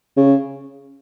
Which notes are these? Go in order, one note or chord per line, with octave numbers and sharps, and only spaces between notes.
C#3